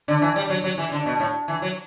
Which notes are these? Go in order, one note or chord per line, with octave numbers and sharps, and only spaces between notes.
D3
E3
G3
F#3
F#3
E3
D3
B2
A2
E3
F#3